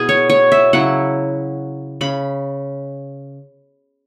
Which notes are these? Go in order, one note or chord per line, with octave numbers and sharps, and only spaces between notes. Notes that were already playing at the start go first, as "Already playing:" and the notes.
Already playing: B2 E4 G#4
C#5
C#5
E5
C#3 F#3 E4 F#5
C#3 B5